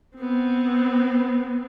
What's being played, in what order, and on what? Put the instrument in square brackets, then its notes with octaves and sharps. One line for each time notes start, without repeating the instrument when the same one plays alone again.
[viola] B3 C4